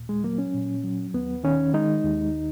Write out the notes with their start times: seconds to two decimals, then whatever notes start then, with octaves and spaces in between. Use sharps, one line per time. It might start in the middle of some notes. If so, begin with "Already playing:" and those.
Already playing: D#2 A#2
0.09 G#3
0.24 F#3 A#3
0.38 C#4
0.54 A#2
0.84 F#3
1.14 D#2 B3
1.44 D#3 C#4
1.74 G#3 D#4
2.04 D#2